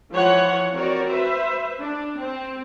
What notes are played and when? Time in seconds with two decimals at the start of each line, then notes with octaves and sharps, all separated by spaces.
0.11 E3 F3 F4 C#5 F#5
0.74 C4 F#4 A#4 C#5 D5
1.09 B4 C5 E5
1.79 D4
2.18 C4